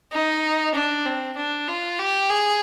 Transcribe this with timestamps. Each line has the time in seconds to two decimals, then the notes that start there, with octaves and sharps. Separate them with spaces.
0.13 D#4
0.75 D4
1.06 C4
1.37 D4
1.68 F4
1.99 G4
2.30 G#4